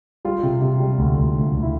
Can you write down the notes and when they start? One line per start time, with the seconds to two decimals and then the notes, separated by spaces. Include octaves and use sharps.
0.25 G3 F4
0.43 C3
0.61 C3
0.80 G3
0.98 D2
1.17 D2
1.35 D2
1.53 D2
1.62 E4